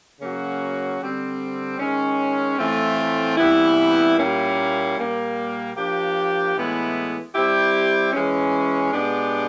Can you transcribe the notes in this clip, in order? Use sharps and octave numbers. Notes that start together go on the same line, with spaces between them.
C#3 F#3 A#3 C#4 F#4
D3 G3 C4
D#3 G#3 C#4
A2 E3 A3 C4 F4
C3 E3 G3 B3 E4
A#2 G3 A#3 C#4 E4
A#2 G3 A#3
F3 A#3 D4 G4
A2 E3 G#3 B3 E4
G3 C4 E4 G4
E3 G#3 C#4
B2 G#3 B3 D4 G4